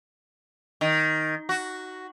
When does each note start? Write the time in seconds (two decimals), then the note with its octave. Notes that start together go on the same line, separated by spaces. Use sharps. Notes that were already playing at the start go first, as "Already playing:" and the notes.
0.81 D#3
1.49 F#4